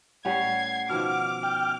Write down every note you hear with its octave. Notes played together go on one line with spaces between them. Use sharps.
A2 G3 C#4 F#5 G#6 C7
B2 D#3 F3 D6 F6
G5 F6